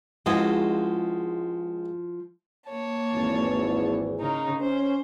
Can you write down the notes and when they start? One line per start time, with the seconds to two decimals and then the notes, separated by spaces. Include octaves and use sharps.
0.26 C#2 F3 G#3 E4 F#4 D#5
2.70 A#3 C#5 A5
3.13 G#1 E2 E3
4.19 C#3 D#4 A#4
4.60 C#4 C5